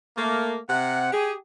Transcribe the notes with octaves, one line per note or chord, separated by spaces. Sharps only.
A3 A#3
C3 F#5
G4 G#4